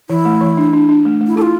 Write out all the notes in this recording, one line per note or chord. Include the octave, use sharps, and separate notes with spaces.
E3 E4
A3
E3
D4
D4
D4
A3
A3
E4
E4 F4 A4